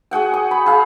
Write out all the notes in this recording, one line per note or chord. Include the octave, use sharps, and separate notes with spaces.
F#4 G#4 F#5 G5
D#6
B5
G#4 F5